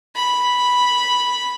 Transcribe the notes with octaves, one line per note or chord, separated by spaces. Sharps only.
B5